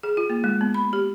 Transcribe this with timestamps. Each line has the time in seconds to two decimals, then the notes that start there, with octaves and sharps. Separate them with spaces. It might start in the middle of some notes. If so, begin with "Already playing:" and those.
0.03 G#4
0.17 F4
0.29 A#3
0.44 G#3
0.61 B3
0.74 B5
0.93 G4